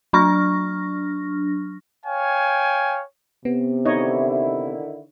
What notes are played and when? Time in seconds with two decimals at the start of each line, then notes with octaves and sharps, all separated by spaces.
0.13 F#3 D4 C#6 F6 A#6
2.06 C#5 F5 G5 G#5
3.45 C3 B3
3.85 D3 D#3 D#4 E4 C#5 D#5